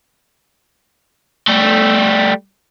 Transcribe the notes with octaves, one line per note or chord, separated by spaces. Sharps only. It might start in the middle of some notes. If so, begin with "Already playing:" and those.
G3 A3